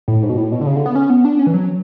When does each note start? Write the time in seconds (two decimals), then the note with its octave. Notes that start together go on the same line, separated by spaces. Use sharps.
0.08 A2
0.23 G#2
0.30 B2
0.37 A2
0.52 B2
0.61 D3
0.67 C#3
0.76 D3
0.86 B3
0.95 C#4
1.10 B3
1.25 D4
1.39 C#4
1.47 E3
1.54 F#3